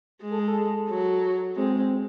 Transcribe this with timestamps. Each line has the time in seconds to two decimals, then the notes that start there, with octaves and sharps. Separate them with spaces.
0.22 G#3
0.31 A4
0.39 G#4
0.48 A4
0.89 F#3
1.56 G#3 C4
1.78 C4